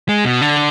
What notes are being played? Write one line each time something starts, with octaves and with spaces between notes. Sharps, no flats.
G#3
B2
D3